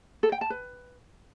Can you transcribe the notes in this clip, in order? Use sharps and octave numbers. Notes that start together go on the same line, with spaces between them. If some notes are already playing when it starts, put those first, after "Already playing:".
A4
G5
A5
B4